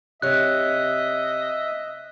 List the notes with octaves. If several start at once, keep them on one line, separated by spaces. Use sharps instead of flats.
C3 C#5 D#5 E5 F#6